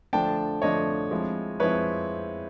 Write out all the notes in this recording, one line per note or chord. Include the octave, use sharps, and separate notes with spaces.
D3 F3 A3 D4 G5 A5
D3 F3 A3 D4 C#5 D#5
F3 G#3 C4 E4
F3 G#3 C4 E4 B4 C#5